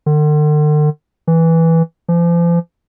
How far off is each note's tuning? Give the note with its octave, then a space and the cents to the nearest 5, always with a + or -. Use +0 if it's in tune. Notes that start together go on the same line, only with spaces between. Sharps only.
D3 +45
E3 -5
F3 -40